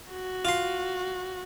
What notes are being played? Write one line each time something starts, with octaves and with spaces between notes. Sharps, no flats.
F#4
F4 C6